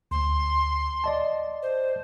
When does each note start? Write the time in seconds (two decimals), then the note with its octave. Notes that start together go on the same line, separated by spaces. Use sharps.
0.11 D2 C6
1.04 D5 D#5 A5
1.62 C5